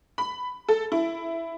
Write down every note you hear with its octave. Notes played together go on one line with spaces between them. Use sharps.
B5
A4
E4